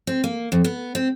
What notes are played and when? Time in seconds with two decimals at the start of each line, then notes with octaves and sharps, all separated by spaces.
0.07 C4
0.24 A#3
0.52 F2
0.64 B3
0.95 C4